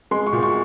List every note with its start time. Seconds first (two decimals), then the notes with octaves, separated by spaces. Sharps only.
0.11 G#3 C6
0.27 C#6
0.33 A#2
0.43 C#6